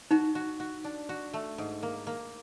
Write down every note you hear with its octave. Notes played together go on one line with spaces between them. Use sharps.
D#4 F#4
F#4
F#4
D4
F#4
A3
G#2
A#3
A#3